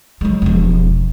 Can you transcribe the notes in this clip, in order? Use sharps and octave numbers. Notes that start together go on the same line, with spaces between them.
F#3 G#3
E1 F3